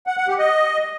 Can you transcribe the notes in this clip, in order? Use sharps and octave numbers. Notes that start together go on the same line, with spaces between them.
F#5
F#5
G4
D#5